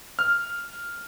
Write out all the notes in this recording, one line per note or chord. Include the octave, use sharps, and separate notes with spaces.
F6